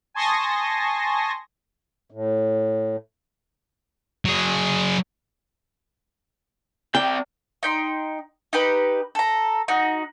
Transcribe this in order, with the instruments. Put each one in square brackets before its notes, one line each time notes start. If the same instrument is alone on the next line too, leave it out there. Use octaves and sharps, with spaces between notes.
[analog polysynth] G#5 A5 C6 C#6 D#6 A#6
[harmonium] A2
[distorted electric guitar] F#3 G#4
[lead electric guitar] C4 D5 [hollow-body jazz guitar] G5
[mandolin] D#4 G5 B5 C6
D#4 G4 B4
A4 A#5
D#4 F#4